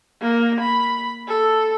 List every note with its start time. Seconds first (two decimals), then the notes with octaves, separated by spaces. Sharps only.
0.21 A#3
0.60 B5
1.28 A4